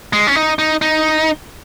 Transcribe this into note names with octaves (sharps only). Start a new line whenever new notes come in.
G#3
C#4
D#4
D#4
D#4